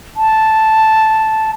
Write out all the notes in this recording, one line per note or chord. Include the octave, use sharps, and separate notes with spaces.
A5